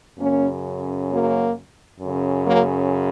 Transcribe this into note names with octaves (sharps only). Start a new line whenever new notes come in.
F#2 C#3 A#3 C#4
F#3 A#3
F#2 C#3
F#3 A#3